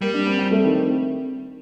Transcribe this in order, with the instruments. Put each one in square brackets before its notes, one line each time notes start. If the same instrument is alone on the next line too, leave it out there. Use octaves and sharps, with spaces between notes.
[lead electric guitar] G3 [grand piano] A#3
[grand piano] D4
C4
C4
A3
D#3